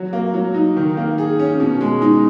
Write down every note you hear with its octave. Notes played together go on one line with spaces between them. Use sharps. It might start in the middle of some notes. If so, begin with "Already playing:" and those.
Already playing: F#3 F#4
A#3
F#3
D#4
D#3
A#3
G#4
C#4
B2
G#3
D#4